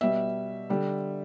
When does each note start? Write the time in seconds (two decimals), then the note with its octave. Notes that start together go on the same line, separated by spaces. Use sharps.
0.01 B2 G3 E5
0.70 D3 G3